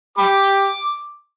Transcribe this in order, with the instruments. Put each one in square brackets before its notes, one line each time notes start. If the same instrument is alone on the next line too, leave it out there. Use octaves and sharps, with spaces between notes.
[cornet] G4 [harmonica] B5 D6